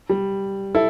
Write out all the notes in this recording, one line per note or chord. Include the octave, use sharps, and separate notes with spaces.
G3
E4 A4